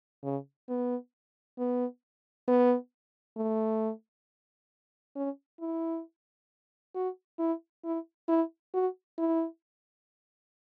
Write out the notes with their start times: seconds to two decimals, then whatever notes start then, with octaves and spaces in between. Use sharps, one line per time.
0.24 C#3
0.69 B3
1.59 B3
2.48 B3
3.37 A3
5.16 C#4
5.60 E4
6.95 F#4
7.39 E4
7.85 E4
8.28 E4
8.74 F#4
9.18 E4